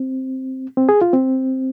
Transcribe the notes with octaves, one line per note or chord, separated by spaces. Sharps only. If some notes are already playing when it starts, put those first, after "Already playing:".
Already playing: C4
C4
G#4
F4
C4